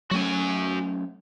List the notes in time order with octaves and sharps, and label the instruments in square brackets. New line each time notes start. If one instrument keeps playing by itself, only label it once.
[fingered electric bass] F#3 A3 C#4 [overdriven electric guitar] F#4 G#5